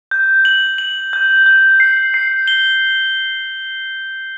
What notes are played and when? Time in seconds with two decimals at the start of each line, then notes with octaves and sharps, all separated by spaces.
0.11 G6
0.45 F#7
0.78 F#7
1.13 G6
1.46 G6
1.80 C7
2.14 C7
2.48 G7